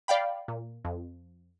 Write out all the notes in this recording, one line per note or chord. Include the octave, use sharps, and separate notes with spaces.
D5 F5 G5 B5
A#2
F2